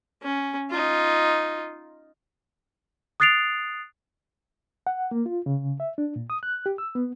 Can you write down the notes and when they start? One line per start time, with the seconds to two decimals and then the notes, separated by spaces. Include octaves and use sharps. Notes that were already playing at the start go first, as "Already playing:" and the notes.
0.23 C#4
0.70 D#4 F4
3.20 D#6 F#6 A6 C7 D7 F7
4.87 F#5
5.11 A#3
5.26 F4
5.46 C#3
5.80 E5
5.98 D4
6.16 A#2
6.30 D#6
6.43 F#6
6.66 G4
6.78 E6
6.95 B3